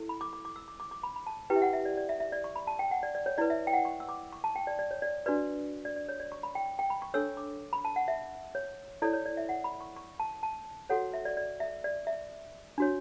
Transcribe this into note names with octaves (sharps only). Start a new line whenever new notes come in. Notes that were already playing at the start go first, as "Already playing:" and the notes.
Already playing: E4 A4
B5
D6
D6
D6
E6
D6
D6
D6
B5
B5
A5
E4 G4 B4 G5
E5
F#5
E5
D5
D5
E5
E5
D5
C#6
B5
A5
G5
F#5
D5
D5
C#5
E4 B4 D5
E5
G5
F#5
C#6
E6
D6
C#6
A5
G5
D5
D5
C#5
D5
D4 F#4 B4 D5
D5
D5
C#5
D5
C#6
B5
G5
G5
B5
C#6
D4 A4 C#5 E6
D6
B5
A5
F#5
E5
C#5
E4 A4 C#5 D5
C#5
D5
E5
F#5
B5
C#6
C#6
A5
A5
F#4 A4 C#5 F#5
E5
D5
D5
E5
D5
E5
D4 F#4 C#5